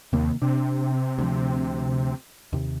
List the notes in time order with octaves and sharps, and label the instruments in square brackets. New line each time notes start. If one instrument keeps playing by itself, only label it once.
[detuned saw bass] D#2 [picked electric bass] C3 D#3 A#3
[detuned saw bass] C3 [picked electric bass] D4
[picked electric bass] D2 F3
D#2 C3